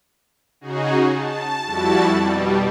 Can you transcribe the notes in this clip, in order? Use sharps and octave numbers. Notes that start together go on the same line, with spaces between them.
C#3 D#4 F#4 G#4
A5
F2 G3 E4 F#4 A5 A6
B2 G3